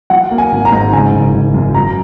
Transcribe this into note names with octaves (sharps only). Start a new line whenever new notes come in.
F#3 F#5
A#3
G#5
G#1
A#5
G#2
C#3 G#5
F#1
F#1
F#2
F#3 A#5